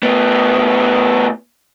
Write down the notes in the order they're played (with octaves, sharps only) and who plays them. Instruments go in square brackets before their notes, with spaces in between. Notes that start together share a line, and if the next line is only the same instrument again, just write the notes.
[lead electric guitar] A2 B3